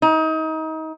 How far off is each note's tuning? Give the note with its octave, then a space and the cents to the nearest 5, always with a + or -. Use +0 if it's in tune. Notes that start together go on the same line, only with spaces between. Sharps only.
D#4 +30